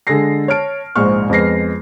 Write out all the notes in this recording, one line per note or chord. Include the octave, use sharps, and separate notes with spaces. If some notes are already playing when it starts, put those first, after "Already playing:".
D3 G#3 G#4 A4 A#6 C7
C#5 A5 F6 D7
A#1 G#2 G#3 C5 C#6 F6
F2 G#3 B3 A#6 C7